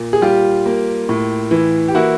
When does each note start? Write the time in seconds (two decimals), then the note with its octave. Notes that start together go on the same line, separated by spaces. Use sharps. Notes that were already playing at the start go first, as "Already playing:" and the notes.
Already playing: A#2
0.13 G#4
0.22 G3 F4 G4
0.66 A#3
1.09 A2
1.51 E3
1.88 G4
1.95 A#3 E4 F#4